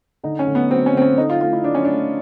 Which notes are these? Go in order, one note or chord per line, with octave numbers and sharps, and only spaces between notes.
D3 D#4
C#4
D3
B3
F#3 C4
C#4
D3 C4
C#4
A3 D#4
F4
A3 F4
E4
A3 D4
C#4
A3 D4